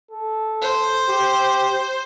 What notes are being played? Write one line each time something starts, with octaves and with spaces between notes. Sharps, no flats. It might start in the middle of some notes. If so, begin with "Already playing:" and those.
A4
C5
G4